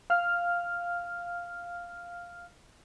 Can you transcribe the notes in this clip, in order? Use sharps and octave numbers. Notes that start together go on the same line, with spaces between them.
F5 F6